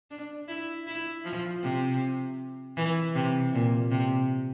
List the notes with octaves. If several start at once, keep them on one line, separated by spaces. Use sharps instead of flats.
D4
E4
E4
F3
C3
E3
C3
A#2
C3